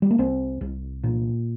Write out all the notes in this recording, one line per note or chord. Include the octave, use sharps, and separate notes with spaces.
G3
A#3
C2 C4
C2
A#2